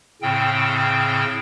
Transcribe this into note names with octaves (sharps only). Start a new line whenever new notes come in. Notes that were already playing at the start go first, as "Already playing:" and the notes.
A2 C#3 C4 G5